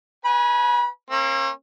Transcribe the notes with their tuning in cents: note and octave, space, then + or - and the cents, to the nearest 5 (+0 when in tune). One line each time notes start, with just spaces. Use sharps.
B4 +0 G#5 +0 B5 -35
A#3 +0 C#4 -45